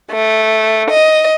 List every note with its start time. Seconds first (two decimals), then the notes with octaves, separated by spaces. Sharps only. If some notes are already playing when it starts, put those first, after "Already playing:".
0.10 A3
0.90 D#5